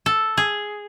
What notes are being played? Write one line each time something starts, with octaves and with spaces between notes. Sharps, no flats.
A4
G#4